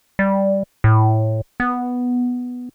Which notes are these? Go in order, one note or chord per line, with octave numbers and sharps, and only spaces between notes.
G3
A2
B3